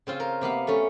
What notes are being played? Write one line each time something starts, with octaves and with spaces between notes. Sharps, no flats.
C#3 C4 F4
A#4
C3 A#3 B3 F5
A3 C#4